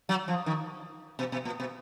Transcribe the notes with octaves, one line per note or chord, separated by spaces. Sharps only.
F#3
F3
D#3
B2
B2
A#2
B2